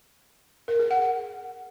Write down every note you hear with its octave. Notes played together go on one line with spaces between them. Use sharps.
A#4
G#4
F#5
F#5